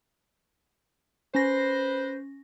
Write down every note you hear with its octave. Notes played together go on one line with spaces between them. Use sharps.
C#4 B4 C5 A#6